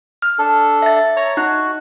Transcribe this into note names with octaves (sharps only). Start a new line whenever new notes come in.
F6
D4 A4
E5 A6
C#5 A#5
D#4 F#4 F#6